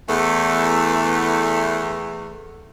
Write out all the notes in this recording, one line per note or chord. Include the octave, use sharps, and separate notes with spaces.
E2 A3